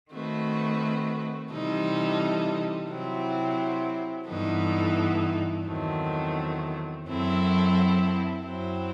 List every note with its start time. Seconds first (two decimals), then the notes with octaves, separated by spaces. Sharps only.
0.11 D#3 A3 C4 F#4 B4
1.50 C3 E3 G3 D#4 A4
2.89 C3 F#3 C4 E4
4.27 G2 E3 B3 D#4 A4
5.66 E2 D#3 F#3 A3 C4
7.06 F#2 F#3 C4 E4 A4
8.45 F#2 F#3 C4 E4